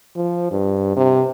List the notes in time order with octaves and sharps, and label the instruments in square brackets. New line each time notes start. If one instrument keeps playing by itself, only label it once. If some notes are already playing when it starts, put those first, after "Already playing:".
[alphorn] F3
G2
C3